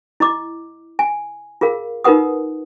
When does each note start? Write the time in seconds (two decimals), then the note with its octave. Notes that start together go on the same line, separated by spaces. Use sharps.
0.20 E4 D#5 D6
0.99 G#5
1.61 F4 G#4 A#4 F5
2.04 D#4 F4 A#4 B4 F#5 D#6